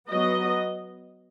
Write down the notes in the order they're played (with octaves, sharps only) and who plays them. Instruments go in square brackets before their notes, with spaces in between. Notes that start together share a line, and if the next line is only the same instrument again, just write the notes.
[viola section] F#3 B3 D#5